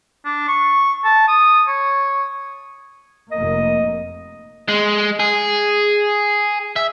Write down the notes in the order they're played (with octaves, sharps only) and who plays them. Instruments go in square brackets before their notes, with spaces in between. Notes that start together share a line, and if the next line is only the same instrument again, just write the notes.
[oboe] D4
C#6
A5
D#6
C#5
[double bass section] F1 A#3 [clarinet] D#5
[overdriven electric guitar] G#3
G#4
E5